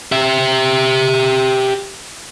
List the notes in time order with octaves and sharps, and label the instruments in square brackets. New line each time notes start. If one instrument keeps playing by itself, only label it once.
[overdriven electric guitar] G4 E5